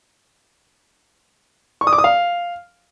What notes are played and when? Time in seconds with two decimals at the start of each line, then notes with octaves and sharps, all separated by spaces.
1.81 C#6
1.87 D#6
1.93 D6
1.98 D#6
2.04 F5